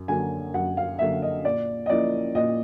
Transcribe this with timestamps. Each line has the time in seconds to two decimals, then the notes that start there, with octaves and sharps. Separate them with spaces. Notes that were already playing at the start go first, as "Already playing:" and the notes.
Already playing: F#2
0.08 D3 F#3 A#3 G#5
0.54 F#2 F#5
0.77 F5
0.99 D3 F#3 A#3 E5
1.22 D#5
1.45 A#2 D5
1.86 D#5
1.89 F3 A#3 C#4 E4 D5
2.35 A#2 D#5